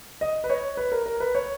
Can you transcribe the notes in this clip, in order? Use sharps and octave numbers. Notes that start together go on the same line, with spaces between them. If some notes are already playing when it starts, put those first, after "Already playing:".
D#5
B4
C#5
B4
A#4
A#4
B4
C#5